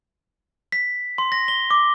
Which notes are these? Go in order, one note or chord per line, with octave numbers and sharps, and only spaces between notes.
B6
C6
A#6
G7
D6